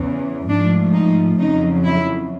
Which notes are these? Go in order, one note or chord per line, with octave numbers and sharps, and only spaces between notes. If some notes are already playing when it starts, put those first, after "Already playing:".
Already playing: E2 C#3 E3
G#2 F3 A3 D4
D#4
F2 C#3 F#3 D#4
E4